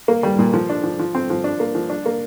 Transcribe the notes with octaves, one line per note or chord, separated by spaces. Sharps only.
A#3
G3
A#2
F3
D4
F3
F3
C4
F3
D4
A#3
F3
D4
A#3